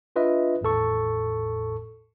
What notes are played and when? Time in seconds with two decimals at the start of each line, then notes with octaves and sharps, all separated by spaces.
0.16 D4 F4 B4 D#5 E5
0.61 G#1 E2 A2 A4 C#6